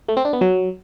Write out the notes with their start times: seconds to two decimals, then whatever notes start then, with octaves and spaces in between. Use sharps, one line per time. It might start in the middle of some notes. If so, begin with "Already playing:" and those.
0.09 A3
0.17 C4
0.25 D4
0.33 B3
0.41 F#3